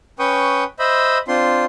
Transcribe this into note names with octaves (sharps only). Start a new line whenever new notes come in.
C#4 B4 G5 C#6 D#6
C5 D#5 E5 B5
C4 D4 F4 C6